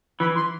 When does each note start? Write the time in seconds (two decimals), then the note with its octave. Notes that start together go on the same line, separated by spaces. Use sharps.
0.20 E3 B5
0.35 C6